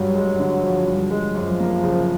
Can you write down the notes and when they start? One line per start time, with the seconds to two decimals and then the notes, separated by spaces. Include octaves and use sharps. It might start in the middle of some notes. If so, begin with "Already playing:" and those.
Already playing: G2 F#3
0.15 G#3
0.39 D3
0.63 F3
0.87 G2
1.11 G#3
1.35 F#2 F3
1.60 A#3
1.84 C#3